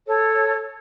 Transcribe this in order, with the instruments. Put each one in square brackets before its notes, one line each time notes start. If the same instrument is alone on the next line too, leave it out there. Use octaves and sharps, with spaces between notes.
[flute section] A4 C#5